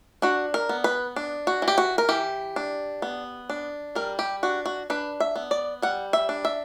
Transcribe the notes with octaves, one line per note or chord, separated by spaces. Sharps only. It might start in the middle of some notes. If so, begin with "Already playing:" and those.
D4 F#4
A#4
B3
B4
D4
F#4
E3
G4
F#4
A#4
E3 G4
D4
B3
D4
G3 A#4
G4
D4 F#4
F#4
D4 B4
E5
B3
D5
G3 F#5
E5
D4
E5